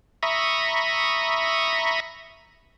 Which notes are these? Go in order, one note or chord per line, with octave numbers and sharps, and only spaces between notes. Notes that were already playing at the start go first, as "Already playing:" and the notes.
E5 A#5 B5 C#6 D#6